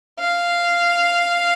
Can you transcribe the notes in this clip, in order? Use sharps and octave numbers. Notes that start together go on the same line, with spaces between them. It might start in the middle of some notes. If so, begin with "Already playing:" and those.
F5